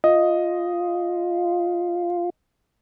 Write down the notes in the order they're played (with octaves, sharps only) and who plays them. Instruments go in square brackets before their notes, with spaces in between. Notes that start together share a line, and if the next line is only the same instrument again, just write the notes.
[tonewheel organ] F4 [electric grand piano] D#5